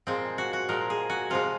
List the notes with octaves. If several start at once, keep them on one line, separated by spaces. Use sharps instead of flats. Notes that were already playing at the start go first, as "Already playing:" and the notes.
A#2 F3 G#3 C4
F#4
F#4
A#2 F3 G#3 A#4
G#4
F#4
C3 F3 G#3 F4